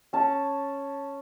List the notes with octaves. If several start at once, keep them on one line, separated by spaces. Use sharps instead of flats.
C#4 A5